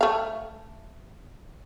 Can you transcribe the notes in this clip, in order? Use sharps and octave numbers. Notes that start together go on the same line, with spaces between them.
A3 F5